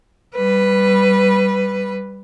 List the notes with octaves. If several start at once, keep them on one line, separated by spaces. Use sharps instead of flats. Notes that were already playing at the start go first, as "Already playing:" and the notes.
G3 B4